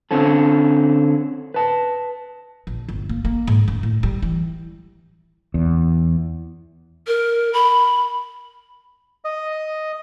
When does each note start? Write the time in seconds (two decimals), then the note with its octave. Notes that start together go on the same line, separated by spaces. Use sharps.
0.11 D3 C4 C#4 A4
1.54 B4 A5
2.67 A#1
2.89 G1
3.09 A#3
3.25 A#3
3.47 G#2
3.68 F#2
3.83 A2
4.03 G3
4.23 E3
5.54 E2
7.07 A#4
7.53 B5
9.25 D#5